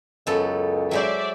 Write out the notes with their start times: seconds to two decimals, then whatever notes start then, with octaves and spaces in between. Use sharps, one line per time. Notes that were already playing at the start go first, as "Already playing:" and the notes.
0.27 C#2 F#2 B3 A4
0.91 F#3 G#3 C5 D5 E5